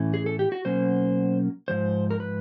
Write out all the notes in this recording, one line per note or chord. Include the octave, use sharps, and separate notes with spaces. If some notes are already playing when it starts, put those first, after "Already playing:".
Already playing: A2 E3 A3 C#4
G#4
A4
G4
F#4
B2 F#3 A#3 C#4 C5
G#2 F3 C5
A#4
B4